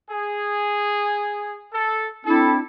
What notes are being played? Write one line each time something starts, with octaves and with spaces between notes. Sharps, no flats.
G#4
A4
C4 D4 E4 A4